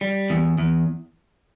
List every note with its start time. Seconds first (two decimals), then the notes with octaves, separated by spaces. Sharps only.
0.01 G3
0.30 E2
0.58 E2